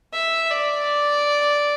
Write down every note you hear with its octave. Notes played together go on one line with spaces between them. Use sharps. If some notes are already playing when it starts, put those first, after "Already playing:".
E5
D5